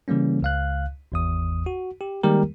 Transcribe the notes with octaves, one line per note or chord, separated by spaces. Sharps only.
C#3 E3 G3 A#3 C#4
C#2 F5 F#6
G#1 E2 D#6
F#4
G4
D#3 G3 G#3 A#3 G4 A#4